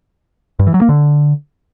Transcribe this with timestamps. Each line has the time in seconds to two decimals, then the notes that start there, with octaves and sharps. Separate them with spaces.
0.59 G2
0.67 E3
0.74 F#3
0.81 A#3
0.89 D3